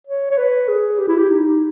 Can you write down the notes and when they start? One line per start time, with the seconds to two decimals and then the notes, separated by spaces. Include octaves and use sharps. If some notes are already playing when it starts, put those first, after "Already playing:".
0.07 C#5
0.30 C#5
0.38 B4
0.68 G#4
0.98 G4
1.08 E4
1.18 G4
1.30 D#4